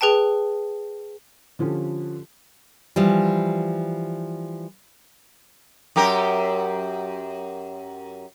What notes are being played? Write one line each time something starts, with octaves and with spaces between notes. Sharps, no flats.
G#4 B4 G5 A5
D3 F3 C#4 F4 G4
E3 F3 G3
F#2 G4 A#4